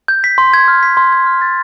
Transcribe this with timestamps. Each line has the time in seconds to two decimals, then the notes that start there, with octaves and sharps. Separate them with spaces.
0.08 G6
0.24 B6
0.38 C6
0.54 G#6
0.68 F6
0.83 B6
0.97 C6
1.12 G#6
1.26 F6
1.41 A6